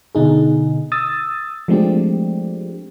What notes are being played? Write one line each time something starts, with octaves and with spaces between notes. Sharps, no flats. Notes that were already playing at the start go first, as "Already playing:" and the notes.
B2 D3 D#4 G#4
D#6 E6 A6
F3 G#3 A3 C4 D4 G4